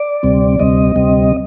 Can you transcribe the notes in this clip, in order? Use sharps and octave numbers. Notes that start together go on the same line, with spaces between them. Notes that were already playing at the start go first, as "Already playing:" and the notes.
Already playing: D5
D2 C3 G3 C4
D2 C3 G3 C4 D#5
D2 C3 G3 C4